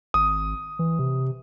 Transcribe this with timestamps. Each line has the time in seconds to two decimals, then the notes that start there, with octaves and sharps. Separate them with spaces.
0.14 G#1 D#6
0.79 E3
0.99 C3